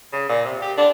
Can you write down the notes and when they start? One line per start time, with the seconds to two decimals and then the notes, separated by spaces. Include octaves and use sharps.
0.13 C#3
0.29 A#2
0.45 C3
0.62 G4
0.77 D4